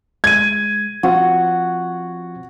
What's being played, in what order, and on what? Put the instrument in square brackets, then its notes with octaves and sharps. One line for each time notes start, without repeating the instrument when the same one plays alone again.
[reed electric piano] G#3 [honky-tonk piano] G#6 D#7
[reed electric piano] F3 C4 F4 [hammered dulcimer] F#4